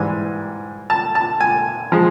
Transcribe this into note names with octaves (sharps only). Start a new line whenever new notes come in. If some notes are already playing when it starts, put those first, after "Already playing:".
Already playing: G#2 E3 G3 G#5
A5
A5
G#5
F3 G#3